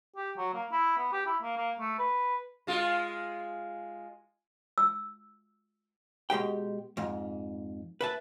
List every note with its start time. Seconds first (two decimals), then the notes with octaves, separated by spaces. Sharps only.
0.16 G4
0.37 F#3
0.54 A#3
0.72 E4
0.97 B3
1.12 G4
1.26 E4
1.42 A#3
1.57 A#3
1.79 A3
1.98 B4
2.67 G#3 F4
4.78 E6
6.30 B2 G#3 G4 G5
6.97 F2 G#2
8.01 B4 E5 A5